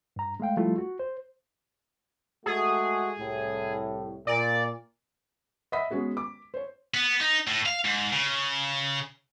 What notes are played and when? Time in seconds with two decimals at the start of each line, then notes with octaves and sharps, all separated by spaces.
0.16 G2 A#5
0.40 G#3 A3 F5 G5
0.57 F3 G3 A3 E4 F4
0.78 F#4
0.99 C5
2.46 G#3 A3 F#4 G#4
3.19 C2 A2
4.27 A#2 D5
5.72 D#5 E5 F#5 B5 D#6 B6
5.91 G#3 B3 C#4 F#4 G#4
6.17 D6
6.54 C5 C#5
6.94 B3
7.21 D#4
7.47 A2
7.66 F5
7.85 G#2
8.12 C#3